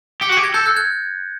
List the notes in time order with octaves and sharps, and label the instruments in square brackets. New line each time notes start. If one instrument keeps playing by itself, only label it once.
[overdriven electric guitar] G4 [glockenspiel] B6 C#7
[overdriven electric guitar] F#4
[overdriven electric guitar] G4 [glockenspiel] B6 C#7
[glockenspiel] G#6 A#6
[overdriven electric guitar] A4 [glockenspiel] G6 A6
[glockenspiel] F#6 G#6
F#6 G#6